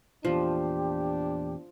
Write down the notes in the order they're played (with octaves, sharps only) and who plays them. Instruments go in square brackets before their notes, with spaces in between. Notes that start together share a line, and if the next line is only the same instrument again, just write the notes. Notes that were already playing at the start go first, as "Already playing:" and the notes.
[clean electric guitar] E2 A#2 [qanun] F3 [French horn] D4 [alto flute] G4